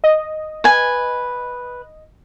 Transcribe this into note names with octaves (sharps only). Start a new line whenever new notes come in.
D#5
B4 G#5